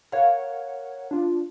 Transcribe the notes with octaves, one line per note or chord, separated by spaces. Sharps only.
A#4 C#5 F5 F#5
D4 F4